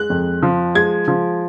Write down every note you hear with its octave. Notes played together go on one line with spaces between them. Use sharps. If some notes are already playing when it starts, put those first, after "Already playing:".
Already playing: G#3 F#6
F2
F3
G#3 G#6
F3